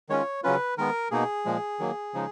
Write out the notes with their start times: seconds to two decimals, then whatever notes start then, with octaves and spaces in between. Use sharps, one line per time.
0.09 D#3 G#3 C#4 F4 C#5
0.43 C#3 F#3 C#4 F4 B4
0.77 D#3 G#3 B3 A#4
1.11 B2 A#3 D#4 G#4
1.45 A#2 F3 G#3
1.79 D#3 F#3 A#3
2.14 C#3 F3 G#3 D#4